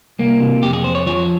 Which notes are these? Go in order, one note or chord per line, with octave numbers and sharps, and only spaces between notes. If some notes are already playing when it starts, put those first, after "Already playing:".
C2 A#3
C3
F2 G4
G#4
F2 C5
C#5
F3 C#5